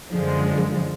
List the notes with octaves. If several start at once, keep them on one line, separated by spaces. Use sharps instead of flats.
F#2 D3 F3 G#3